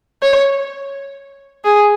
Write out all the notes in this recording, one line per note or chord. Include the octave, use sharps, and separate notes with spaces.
C#5
G#4